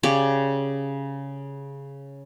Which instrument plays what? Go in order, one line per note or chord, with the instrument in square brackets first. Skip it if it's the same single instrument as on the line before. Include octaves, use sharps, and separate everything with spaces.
[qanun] C#3 G4 C#5 D5